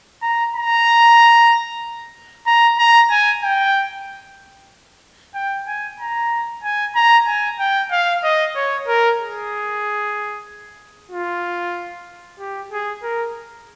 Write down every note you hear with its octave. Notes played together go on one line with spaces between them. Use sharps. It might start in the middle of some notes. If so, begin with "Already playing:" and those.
A#5
A#5
A#5
A#5
G#5
G5
G5
G#5
A#5
G#5
A#5
G#5
G5
F5
D#5
C#5
A#4
G#4
F4
G4
G#4
A#4